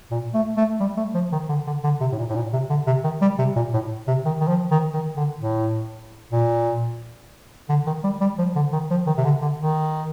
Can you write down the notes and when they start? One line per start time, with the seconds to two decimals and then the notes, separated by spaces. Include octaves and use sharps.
0.11 A#2
0.34 A3
0.57 A3
0.80 G3
0.97 A3
1.14 F3
1.32 D#3
1.49 D3
1.67 D3
1.84 D3
2.00 C3
2.12 A2
2.18 A#2
2.29 A2
2.35 A#2
2.53 C3
2.70 D3
2.87 C3
3.04 D#3
3.21 G3
3.39 C3
3.56 A#2
3.73 A2
4.07 C3
4.25 D#3
4.40 D#3
4.48 F3
4.71 D#3
4.93 D#3
5.17 D3
5.40 A2
6.32 A#2
7.69 D3
7.87 D#3
8.04 G3
8.21 G3
8.38 F3
8.55 D3
8.73 D#3
8.90 F3
9.07 D#3
9.17 C3
9.24 D3
9.42 D3
9.58 D#3